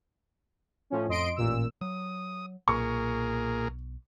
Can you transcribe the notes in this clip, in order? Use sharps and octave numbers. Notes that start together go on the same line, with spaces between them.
A2 F3 C#4
F2 D#5 C6 D7
A1 A#2 E6
F#3 D#6
B1 A#2 G#4 A#4 C#6